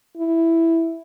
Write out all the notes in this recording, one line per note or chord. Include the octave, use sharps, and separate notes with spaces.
E4